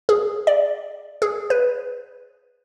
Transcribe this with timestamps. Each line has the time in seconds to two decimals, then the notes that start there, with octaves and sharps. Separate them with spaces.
0.09 G#4
0.47 D5
1.22 G#4
1.50 B4